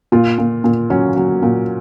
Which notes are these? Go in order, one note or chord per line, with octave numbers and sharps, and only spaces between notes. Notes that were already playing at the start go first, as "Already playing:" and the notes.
A#2 F4
A#2
A#2
F#3 C#4
F#3
A#2